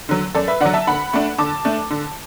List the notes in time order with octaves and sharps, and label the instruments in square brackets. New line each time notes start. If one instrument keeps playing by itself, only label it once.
[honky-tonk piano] D3 F#3
F#2 A4 D5
B4 E5
D3 F#3 D5 F#5
E5 A5
D3 F#5 B5
A3 D4
D3 A5 D6
A3 D4
D3